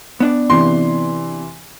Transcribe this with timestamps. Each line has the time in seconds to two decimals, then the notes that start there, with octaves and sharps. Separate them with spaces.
0.20 B3 D4 D5
0.50 C3 E3 C6